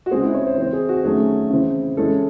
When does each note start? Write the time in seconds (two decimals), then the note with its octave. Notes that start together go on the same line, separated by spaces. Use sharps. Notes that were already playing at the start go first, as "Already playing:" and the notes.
0.06 F#4
0.11 C#3 G#3 C4 G#4
0.23 E4
0.34 C#5
0.46 C5
0.57 E3 C4 C5
0.73 G#4
0.89 F#4
1.04 D#3 F#3 A3 C#4 G#4
1.50 C#3 E3 C4
1.97 E3 G#3 C#4 A4